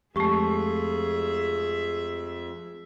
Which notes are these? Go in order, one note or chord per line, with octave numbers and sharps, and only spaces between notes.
F2 G#3 A3 G4 G#4 E5 C#6